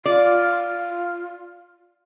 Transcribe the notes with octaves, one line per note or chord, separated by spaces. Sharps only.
F4 D5